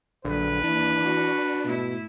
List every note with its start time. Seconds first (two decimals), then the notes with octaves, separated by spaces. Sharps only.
0.25 A#1 D3 F#3 B4
0.64 D#2 E3 D4
1.02 F#4
1.65 G#2 B2 A3 E4